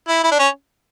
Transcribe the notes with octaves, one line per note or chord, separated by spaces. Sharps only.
E4
E4
D4
C#4